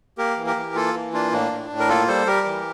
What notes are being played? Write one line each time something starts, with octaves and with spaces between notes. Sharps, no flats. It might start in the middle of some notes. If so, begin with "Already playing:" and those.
A#3 G4 A#4
E3
G4 A#4
E3
A#3 F4 A4
E3
A#3 D4 F4
A2 D4
A2
A2
A#4
A#3 F4 A4
G3 A4 C5
G3 G4 A#4
E3